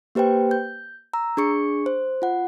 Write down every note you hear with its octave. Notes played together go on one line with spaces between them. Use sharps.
A#3 G4 B4 C5 G5
G6
A#5 E6
D4 G#4 C#6 C#7
C5
F4 F#5